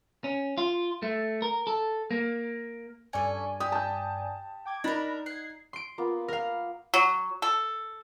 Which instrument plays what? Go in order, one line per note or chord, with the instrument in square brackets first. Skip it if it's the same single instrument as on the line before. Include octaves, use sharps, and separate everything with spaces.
[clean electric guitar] C#4
F4
A3
A#4
A4
A#3
[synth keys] G2 D5 G#5 [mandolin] C#4 A4
[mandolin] G4 [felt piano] D#6
[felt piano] A5 G6
[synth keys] G5 D6 G#6
[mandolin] D4 A#4 [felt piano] D#4 [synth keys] B5 F#6 A#6
[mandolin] F#5 [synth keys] G#6 C7
[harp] C6 D7
[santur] A#3 B3 F4
[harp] A#4 F5
[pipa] F#3
A4